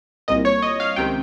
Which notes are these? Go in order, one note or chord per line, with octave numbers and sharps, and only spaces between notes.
C2 A#2 D#5
C#5
D#5
F5
C#2 C3 D#3 G5